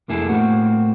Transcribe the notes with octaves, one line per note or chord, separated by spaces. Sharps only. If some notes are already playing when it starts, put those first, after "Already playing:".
C2 F2 A#3 E4 G#4 A4
A2 A#3 C4 F#4